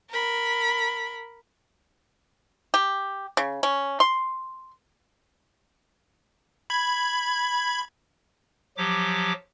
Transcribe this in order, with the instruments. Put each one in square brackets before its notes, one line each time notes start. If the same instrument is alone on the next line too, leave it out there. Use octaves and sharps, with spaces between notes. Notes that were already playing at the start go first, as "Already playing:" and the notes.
[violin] A#4 B5
[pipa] G4
C#3
C#4
C6
[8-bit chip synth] B5 G#6
[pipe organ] F3 F#3 G4 D6